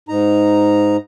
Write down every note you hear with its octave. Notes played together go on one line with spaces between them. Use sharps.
G#2 D#4 A#5